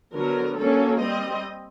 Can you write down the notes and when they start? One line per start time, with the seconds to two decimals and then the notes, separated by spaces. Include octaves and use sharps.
0.13 D3 F#3 B3 A#4
0.57 F#3 A#3 C#4 A4
0.99 G3 C4 D#5